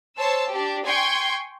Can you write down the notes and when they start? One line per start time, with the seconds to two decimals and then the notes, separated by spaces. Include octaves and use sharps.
0.17 C5 C#5 A5 E6
0.50 D4 G4
0.85 G5 G#5 C6 C#6 G6 G#6